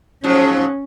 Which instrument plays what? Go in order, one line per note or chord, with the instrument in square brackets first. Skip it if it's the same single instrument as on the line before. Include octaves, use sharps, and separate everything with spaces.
[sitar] G#2 F3 F#3 [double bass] C#4